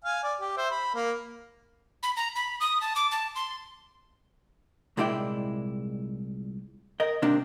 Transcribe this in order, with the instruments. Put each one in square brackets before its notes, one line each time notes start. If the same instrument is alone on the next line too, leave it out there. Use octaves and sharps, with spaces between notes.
[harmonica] F5 G#5
D5
G4
C5 E5
B5
A#3 A#4
[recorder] B5
A#5
B5
D#6
A5
D6
A5
C6
[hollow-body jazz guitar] C2 A#2 G#3 E4 D5 G5
A#4 D#5
G#2 C3 D#3 A#3 C4 D4